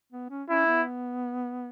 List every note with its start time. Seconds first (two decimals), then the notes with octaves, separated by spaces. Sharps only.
0.12 B3
0.30 C#4
0.49 C#4 E4
0.67 B3